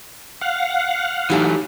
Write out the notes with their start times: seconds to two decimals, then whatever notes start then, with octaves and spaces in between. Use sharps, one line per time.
0.41 F5 F#5
1.30 E3 F#3 A3 D#4 G4 G#5